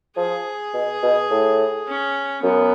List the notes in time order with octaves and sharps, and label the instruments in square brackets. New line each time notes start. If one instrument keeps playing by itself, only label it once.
[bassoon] F3 [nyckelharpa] G#4
[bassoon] B2
B2
A2
[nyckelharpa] C#4
[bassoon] F#2 [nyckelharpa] B3